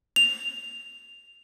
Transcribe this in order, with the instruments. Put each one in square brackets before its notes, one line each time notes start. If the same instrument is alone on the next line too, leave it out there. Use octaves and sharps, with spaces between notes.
[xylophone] F7